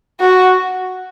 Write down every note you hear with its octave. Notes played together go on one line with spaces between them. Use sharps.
F#4